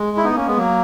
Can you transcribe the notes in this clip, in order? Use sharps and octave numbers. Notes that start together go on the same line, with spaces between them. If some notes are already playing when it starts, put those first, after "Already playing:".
Already playing: G#3
E4
B3 D#4
A#3 C#4
G#3 B3
F#3 A#3